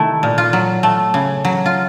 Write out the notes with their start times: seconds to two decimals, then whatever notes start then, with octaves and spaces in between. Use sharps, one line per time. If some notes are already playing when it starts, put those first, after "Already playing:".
Already playing: C3 D#3 A3 E4
0.23 A#2
0.38 F4
0.53 F#3
0.83 A3
1.14 C#3
1.45 F#3
1.66 F4